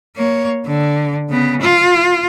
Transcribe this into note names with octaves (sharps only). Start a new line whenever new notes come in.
A#3 C#5
D3
C#3 B3
F4